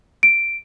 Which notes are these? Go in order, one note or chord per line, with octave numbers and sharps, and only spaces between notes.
D7